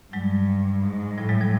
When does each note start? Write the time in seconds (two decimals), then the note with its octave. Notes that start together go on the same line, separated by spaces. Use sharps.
0.13 G2 F#3 G#3
0.83 G#2
1.18 A2 F3 G3
1.29 F#3 G#3
1.41 F3 G3